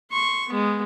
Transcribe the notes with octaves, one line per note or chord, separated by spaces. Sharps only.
C6 C#6
G#3 B3